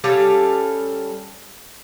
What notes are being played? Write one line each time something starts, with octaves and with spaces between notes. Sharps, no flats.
G3 C#4 A4 F5